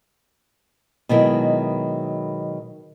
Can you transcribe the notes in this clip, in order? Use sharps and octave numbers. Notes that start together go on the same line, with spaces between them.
B2 D#3 F#3 G#3 E4 A#4